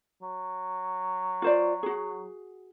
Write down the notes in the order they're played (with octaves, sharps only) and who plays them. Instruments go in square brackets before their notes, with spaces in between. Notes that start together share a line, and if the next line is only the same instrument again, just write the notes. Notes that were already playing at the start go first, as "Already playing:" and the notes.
[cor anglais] F#3
[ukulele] F4 C5 D5
F#4 G#4